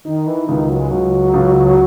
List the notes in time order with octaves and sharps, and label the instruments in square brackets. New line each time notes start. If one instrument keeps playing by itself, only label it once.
[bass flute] D#3 [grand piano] D#4
[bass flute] E3
[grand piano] C#2 [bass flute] D#3
[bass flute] F#3
G#3
[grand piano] C#2 [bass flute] F#3
[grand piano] C#2